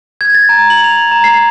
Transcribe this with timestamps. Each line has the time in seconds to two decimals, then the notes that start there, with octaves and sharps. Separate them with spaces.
0.21 G#6
0.35 A6
0.49 A#5
0.70 F#7
0.84 F7
1.11 A#5
1.24 C7